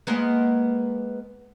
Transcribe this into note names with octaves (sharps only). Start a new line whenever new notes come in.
G#3 A#3 B3